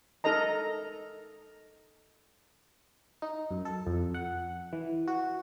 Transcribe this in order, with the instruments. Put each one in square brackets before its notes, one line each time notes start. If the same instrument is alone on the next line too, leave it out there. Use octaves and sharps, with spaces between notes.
[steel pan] D#4 A4 A#4 D#5 A#5
[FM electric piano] D#4
F#2
A4
F2
F#5
E3
F#4